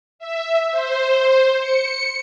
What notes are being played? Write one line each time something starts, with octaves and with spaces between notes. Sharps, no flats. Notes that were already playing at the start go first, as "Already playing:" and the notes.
E5
C5
C#7